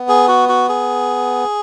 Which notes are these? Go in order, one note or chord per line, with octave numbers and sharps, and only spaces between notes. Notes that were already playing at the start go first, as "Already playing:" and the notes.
Already playing: B3
G#4
F#4
F#4
G#4